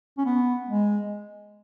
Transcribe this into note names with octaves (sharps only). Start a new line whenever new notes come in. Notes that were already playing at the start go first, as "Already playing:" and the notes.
C#4
B3
G#3